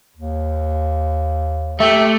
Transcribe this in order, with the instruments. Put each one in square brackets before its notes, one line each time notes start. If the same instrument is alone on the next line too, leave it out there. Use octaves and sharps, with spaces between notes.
[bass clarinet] D#2
[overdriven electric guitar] A3 [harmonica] G4 E5